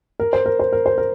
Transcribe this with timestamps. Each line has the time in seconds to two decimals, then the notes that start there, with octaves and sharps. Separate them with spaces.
0.20 A#4
0.33 C5
0.46 A#4
0.60 C5
0.73 A#4
0.86 C5
0.98 A#4